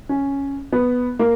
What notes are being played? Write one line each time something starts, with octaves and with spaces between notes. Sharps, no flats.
C#4
B3
A#3